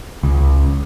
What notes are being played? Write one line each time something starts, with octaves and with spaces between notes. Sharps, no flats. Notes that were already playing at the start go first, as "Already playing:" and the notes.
C#2